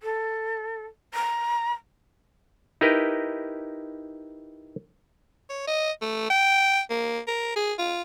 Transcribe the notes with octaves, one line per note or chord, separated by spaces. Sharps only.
A4
A#5
D#4 E4 G4 A#4 B4 D#5
C#5
D#5
A3
G5
A#3
A#4
G#4
F4